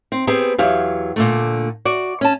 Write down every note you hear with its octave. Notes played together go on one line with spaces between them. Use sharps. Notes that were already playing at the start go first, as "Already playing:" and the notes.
C4
B3 C4 G4 G#4
E2 F#3 G4 F5
A#2 D3 A3
F#4 D5
C#4 A5